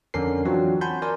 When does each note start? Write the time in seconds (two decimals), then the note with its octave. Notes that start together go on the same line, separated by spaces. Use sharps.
0.14 F2 D3 C#4 D4 A#4 C7
0.45 E3 F#3 C4 D4 F4 F#4
0.81 F#5 G#5 A5 B5 C6 G6
1.02 A#4 D5 G#5 C6